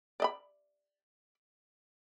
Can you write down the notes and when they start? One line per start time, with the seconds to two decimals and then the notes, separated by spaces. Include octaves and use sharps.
0.20 D5 D#5 B5